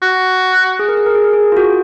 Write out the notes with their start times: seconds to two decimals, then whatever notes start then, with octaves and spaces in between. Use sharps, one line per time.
0.02 F#4
0.79 G#4
0.89 A#4
0.97 G#4
1.06 A#4
1.15 G#4
1.24 A#4
1.33 G#4
1.52 F4
1.57 F#4